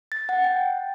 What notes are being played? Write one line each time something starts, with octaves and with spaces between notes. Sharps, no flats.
A6
F#5
G5